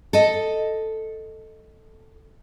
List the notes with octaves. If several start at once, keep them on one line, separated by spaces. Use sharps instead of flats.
A4 D#5